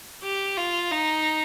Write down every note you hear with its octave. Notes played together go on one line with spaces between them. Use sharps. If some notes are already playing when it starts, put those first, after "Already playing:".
G4
F4
D#4